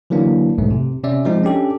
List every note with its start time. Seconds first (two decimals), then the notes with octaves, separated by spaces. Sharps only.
0.10 D3 E3 F#3 A#3 D4
0.58 B1 F2 G#2 A3
0.71 C3
1.03 C3 C#4 D5 E5
1.25 F3 G#3 C4 D#4
1.44 C#4 D4 G4 A4